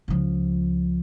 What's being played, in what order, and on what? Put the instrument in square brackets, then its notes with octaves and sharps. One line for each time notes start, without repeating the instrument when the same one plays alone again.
[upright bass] C#2 F3